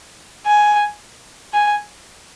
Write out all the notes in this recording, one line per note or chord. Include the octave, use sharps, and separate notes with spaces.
G#5
G#5